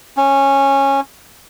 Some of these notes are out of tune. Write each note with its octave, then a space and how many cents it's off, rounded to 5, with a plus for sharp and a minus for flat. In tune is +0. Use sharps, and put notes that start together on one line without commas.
C#4 -15